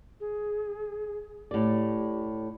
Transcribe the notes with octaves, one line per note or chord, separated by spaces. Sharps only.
G#4
A2 G4 D5